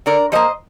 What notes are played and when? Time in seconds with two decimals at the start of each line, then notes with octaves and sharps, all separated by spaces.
0.06 D3 A#4 D5
0.32 F3 A#3 C5 D#5